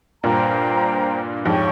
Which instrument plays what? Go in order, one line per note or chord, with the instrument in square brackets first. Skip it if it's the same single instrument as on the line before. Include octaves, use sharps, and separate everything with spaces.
[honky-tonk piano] G2 A#2 [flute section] C5 G5 A#5
[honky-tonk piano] F2 G#2 [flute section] G4 C#5 G5 C#6